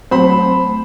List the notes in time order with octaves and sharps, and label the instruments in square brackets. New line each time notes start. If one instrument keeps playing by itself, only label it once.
[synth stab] F#3 C4 [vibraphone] A3 [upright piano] C5 B5